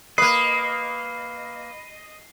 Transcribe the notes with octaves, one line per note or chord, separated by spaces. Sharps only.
A#3 B4 D#5 B5 C7